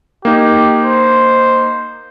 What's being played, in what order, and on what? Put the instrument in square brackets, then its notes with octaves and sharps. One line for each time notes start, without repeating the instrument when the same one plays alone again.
[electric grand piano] A#3 D#4 [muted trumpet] G4
[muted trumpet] C5